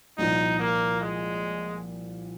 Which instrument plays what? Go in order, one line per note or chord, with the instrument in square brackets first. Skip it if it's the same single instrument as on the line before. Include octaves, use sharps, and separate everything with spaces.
[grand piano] C2 A#2 F3 C4 F4 [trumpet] D#4
[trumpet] A#3
G#3